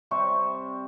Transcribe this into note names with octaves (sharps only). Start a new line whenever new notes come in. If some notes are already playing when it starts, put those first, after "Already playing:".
C3 G3 C4 C#6